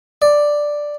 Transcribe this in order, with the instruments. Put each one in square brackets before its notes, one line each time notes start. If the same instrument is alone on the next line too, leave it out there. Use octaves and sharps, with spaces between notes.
[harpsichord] D5